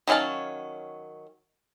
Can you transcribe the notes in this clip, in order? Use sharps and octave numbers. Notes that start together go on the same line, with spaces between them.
D#3 F#3 C#4 F5 A5